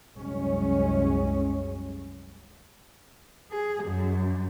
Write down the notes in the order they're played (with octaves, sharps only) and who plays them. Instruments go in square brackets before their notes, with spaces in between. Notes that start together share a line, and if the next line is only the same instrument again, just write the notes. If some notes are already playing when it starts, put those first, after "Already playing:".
[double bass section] C2 F#2 G#3 C#4
[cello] G#4
F#2